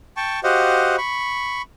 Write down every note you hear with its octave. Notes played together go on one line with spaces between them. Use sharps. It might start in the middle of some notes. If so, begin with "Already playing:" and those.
G5 A5 C#6
F#4 G4 C5 D#5 F5 F#5
B5 C#6